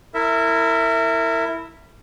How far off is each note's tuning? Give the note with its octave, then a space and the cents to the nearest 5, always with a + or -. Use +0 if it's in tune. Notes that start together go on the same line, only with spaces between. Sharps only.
E4 +0 A#4 -30 E5 +0